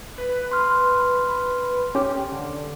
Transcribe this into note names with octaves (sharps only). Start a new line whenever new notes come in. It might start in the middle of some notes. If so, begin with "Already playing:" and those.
B4
C6 F6
C#4 G4
D3